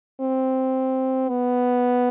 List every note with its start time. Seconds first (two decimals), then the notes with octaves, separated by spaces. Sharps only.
0.21 C4
1.29 B3